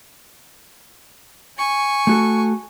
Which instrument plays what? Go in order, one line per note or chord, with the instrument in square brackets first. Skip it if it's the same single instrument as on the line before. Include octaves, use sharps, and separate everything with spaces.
[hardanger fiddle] G#5 C#6
[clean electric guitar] A3 F#4 A4